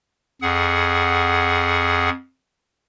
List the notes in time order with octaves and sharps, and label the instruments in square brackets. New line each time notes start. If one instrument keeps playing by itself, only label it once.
[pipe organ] F2 G#4 F#5